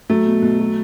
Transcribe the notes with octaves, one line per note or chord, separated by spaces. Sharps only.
F#3 A3
B2
B2
F#3